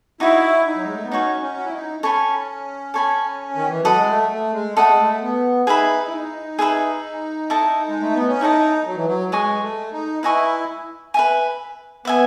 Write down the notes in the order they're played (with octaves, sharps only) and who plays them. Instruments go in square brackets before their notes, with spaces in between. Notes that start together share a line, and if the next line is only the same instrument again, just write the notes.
[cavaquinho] D#4 F#4 C#5 [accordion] E4
[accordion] D#4
F#3
G#3
A3
B3
[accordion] C#4 [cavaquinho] D#4 F#4 C#5
[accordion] C#4
F#4
E4
D#4
[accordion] C#4 [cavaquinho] A4 C#5 G#5 B5
[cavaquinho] A4 C#5 G#5 B5
[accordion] D#3
E3
[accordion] F#3 [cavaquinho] A4 D#5 F#5 B5
[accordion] G#3
A3
A3
G#3
[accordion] A3 [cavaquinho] A4 D#5 F#5 B5
[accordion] G#3
A3
B3
[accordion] D#4 [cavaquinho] G#4 B4 E5 B5
[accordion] E4
D#4
[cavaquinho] G#4 B4 E5 B5
E4 A4 D#5 A5
[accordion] G#3
A3
B3
C#4
[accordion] D#4 [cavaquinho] E4 A4 D#5 A5
[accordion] F#3
E3
F#3
[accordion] G#3 [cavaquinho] B4 D#5 G#5 C#6
[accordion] A3
D#4
[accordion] E4 [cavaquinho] B4 D#5 G#5 C#6
[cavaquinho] B4 E5 G#5
[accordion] B3 [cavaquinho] B4 E5 G#5